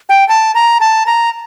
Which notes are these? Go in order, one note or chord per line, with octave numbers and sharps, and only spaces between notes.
G5
A5
A#5
A5
A#5